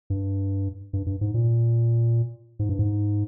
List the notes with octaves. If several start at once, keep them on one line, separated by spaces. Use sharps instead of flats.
G2
G2
G2
G#2
A#2
G#2
G2
G#2